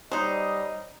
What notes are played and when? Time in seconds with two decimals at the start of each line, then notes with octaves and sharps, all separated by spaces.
0.12 F#3 G3 D#4 C5 D#5